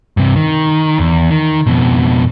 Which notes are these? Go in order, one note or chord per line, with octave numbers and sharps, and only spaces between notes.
G2 C3
D#3
E2
D#3
F2 B2